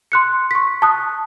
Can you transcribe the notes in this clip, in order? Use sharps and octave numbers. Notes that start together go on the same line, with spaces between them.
C6 F#6 C#7
C#6 B6
A5 D#6 F#6